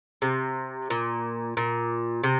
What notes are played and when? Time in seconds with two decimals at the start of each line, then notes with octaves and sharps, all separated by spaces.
0.22 C3
0.90 A#2
1.57 A#2
2.24 C3